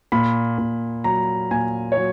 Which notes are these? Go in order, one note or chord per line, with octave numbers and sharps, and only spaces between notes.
A#2 B5
A#2
F#3 A#5
A#2 G#5
C#5
F#3